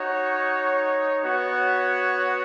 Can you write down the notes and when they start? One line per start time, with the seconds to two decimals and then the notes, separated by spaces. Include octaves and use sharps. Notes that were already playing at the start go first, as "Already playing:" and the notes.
Already playing: D#4 F#4 C#5
1.22 B3 F#4 C#5